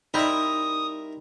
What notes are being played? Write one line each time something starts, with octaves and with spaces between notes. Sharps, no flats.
G3 C4 D#4 E4 A#4 E5 D#6 G6